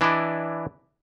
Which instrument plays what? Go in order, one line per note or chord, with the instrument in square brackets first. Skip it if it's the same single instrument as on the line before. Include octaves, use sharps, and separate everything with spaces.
[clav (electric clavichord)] E3 D4 E4 D5 D#5